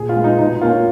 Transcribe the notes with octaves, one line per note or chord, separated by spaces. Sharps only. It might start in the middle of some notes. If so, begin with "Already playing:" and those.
Already playing: A#2 G#4
F4
G#3 B3
D#4
B2 D#4
A#3 C#4 F4